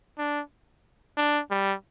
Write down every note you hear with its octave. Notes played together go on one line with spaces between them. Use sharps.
D4
D4
G3